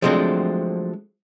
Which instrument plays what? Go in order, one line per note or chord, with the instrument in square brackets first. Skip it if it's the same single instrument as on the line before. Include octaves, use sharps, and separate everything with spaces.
[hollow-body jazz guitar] F3 F#3 G#3 A3 C4 D4